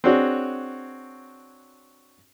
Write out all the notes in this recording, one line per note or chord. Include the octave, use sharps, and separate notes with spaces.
C4 D4 F#4 G#4 C#5